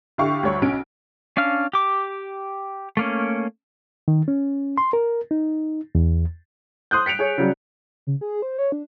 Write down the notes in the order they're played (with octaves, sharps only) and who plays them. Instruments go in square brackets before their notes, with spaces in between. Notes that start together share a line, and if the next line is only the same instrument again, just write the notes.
[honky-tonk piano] D3 E4 G4 F5 C#6
D2 G3 C#5 C#6
B1 C#4 D7
[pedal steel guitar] C#4 D4 F5 F6
G4 D6
A3 A#3 C#4
[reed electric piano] D#3
C#4
C6
A#4
D#4
E2
[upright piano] C6 D#6 F#6 G6
B6 C#7 D7 F7
G#4 C#5
C#3 F#3 G3
[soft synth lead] C#3
G#4
C5
C#5
D4